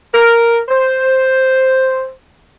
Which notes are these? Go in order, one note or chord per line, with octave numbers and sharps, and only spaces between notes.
A#4
C5